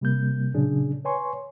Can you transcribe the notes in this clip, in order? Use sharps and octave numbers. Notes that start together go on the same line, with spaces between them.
C3 G3 A#3 G6
A#2 C#3 F#3 C#4 D4 G#4
B4 C#5 G#5 C6 C#6